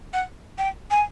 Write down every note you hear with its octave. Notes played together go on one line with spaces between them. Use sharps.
F#5
G5
G#5